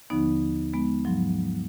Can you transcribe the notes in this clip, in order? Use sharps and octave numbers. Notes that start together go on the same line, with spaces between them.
D#2 D3 F3 B3 D#4
G#3 B3
G#2 F3 F#3